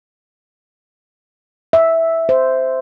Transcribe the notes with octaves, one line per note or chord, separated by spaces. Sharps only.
E5
C5